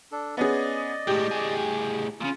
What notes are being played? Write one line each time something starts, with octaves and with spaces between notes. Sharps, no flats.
D4 A4
B3 C#4 G#4 D5 D#5
A2 G#3 G4
A2 G#4
A#2 C#3 F4